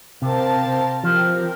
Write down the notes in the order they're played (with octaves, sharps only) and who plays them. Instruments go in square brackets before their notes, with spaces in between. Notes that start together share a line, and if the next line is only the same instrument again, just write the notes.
[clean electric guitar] C3 [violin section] C4 G4 A#4 F5 A5
[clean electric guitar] F3 [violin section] C4 G4 A#4